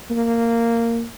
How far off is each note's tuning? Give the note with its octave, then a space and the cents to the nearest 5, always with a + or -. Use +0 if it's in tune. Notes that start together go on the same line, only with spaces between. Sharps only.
A#3 -10